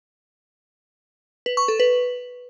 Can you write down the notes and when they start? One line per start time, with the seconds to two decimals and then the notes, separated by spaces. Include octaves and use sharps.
1.46 B4
1.57 C#6
1.68 A4
1.80 B4